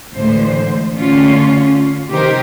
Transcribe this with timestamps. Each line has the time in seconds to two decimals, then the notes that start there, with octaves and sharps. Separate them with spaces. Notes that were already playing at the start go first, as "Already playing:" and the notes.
0.13 D2 A2 D3 E3 G#3 C5
0.94 D3 A3 C#4 F4
2.09 C3 D#3 D#4 G4 A#4 C5